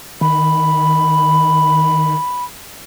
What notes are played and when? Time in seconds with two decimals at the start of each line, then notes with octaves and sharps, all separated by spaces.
0.21 D#3 B5